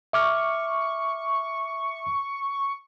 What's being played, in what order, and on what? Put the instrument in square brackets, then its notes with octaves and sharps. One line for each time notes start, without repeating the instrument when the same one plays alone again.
[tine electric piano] E5 D6 F6 [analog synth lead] C#6